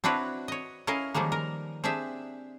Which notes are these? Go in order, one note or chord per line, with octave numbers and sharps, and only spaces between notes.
C4 D4 E4 F#4 B4 C#5
C#5 D#5
C#4 E4 A#4 D#5 F5
D#3 F3 G3 G#3 A#3
A#4
C4 D4 G4 G#4 E5